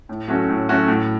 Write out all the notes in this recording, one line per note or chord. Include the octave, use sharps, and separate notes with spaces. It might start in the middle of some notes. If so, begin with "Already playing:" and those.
A2
F#3 A3 C#4 F#4
A2
F#3 A3 C#4 F#4
A2